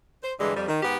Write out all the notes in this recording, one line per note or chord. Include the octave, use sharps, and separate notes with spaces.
C5
G2 D3 E3 G#3
F2 G3
D#3
G#2 B3 G4